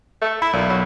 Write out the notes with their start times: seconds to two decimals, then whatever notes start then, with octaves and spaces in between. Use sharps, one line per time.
0.22 A3
0.42 E4 B5
0.53 B1 A#2
0.69 F#3